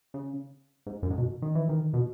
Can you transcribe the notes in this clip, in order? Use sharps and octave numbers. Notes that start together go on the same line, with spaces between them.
C#3
G#2
F#2
G#2
B2
D#3
E3
D#3
B2